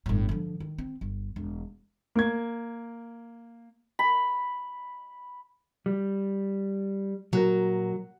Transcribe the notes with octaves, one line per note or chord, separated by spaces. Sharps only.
G1 A2
D3 F3
D#3
C4
G1
E1
A#3 G#6
B5
G3
A#2 F#3 F#4 A#4